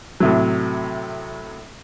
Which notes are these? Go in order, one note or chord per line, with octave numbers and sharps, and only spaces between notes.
A2 C3 F#3